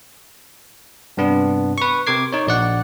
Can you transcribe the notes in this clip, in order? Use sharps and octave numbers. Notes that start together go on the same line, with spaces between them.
G2 C3 B3 D4
B4 C#6
C3 A#4 D6 G#6 C7
D#4 C#5
A#1 D5 F#5